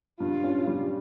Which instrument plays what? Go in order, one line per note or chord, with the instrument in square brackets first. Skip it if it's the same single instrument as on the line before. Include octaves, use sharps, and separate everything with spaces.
[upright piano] G2 [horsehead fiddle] F4
[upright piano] C#4
G3